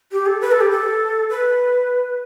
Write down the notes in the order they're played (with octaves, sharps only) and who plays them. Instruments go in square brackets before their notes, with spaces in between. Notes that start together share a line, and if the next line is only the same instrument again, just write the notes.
[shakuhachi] G4
A4
B4
A4
G4
A4
B4